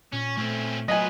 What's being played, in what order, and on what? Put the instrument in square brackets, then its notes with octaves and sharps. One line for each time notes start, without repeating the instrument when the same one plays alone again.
[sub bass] A#2 [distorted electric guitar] C#4
[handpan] A3 [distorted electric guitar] C4 C#4
[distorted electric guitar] A#2 B3 [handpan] F#3 [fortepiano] D#5 G#5